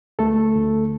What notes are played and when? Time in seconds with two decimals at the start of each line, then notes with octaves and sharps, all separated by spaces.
0.19 D2 A3 A4
0.55 D2